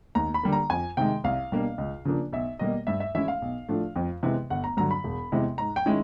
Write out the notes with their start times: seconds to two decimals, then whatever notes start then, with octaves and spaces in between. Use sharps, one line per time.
0.15 D#2 A#5
0.34 B5
0.43 D3 G3 A#3
0.53 A#5
0.70 F2 G#5
0.97 C3 D#3 G#3 G5
1.24 C2 F5
1.52 B2 G3 A#3 D4
1.78 C#2
2.05 C#3 F3 A#3 D4
2.32 B1 E5
2.59 B2 G3 A#3 D#5
2.87 G2 E5
3.00 E5
3.15 E3 G#3 C#4 E4 E5
3.28 F5
3.42 B1
3.69 A2 F3 A3 D4
3.96 F2
4.23 C3 E3 G#3 B3
4.50 G1 F#5
4.64 A#5
4.77 G2 D3 F#3 A#5
4.91 B5
5.04 E1
5.32 E2 C3 E3 G#3
5.58 G#2 A#5
5.76 G5
5.86 D#3 G#3 C#4 E4